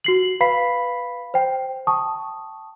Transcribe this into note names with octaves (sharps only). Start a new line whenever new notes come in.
F#4 C7 F#7
B4 F5 B5 B6 C7
C5 G5
G5 A5 C#6 D#6